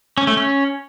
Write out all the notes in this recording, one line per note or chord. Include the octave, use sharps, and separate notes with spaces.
C#4
A3
C#4